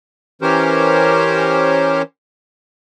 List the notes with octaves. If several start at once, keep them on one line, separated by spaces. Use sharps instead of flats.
E3 C#4 G4 A#4 C5 C#5